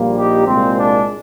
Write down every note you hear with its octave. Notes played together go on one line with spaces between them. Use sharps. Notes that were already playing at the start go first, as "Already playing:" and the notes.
Already playing: A#1 A#2 G3 A#3
D#4 G4
C2 A#2 G#3 C4
D4